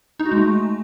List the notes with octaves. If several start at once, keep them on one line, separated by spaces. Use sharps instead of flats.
D#4
F#4
G#3
A3